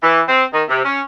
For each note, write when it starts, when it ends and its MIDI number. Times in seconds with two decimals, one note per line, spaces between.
0.02 0.20 52
0.28 0.43 60
0.52 0.62 51
0.68 0.80 48
0.85 1.00 61